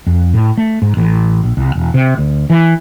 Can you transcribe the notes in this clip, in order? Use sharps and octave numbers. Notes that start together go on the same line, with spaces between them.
F2
A2
A3
G#2
A1
A#1
C2
E1
C3
D2
E3